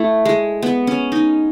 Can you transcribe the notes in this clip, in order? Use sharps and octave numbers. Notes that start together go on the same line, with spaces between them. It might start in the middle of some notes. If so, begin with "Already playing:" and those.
Already playing: A3 E4
G#3
B3
C#4
D#4